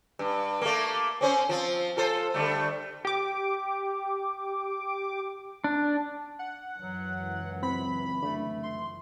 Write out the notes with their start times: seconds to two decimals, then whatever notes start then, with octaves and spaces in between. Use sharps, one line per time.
0.19 G2
0.62 A3 A#3
1.21 C4 C#4 C5
1.49 F3 C4
1.97 F4 A4 C5
2.34 D3 G3 A3
3.05 G4 D6
5.64 D4
6.39 F#5
6.77 C#2 F#2 E3 F#3
7.63 C4 B5
8.22 D3 A3
8.63 C6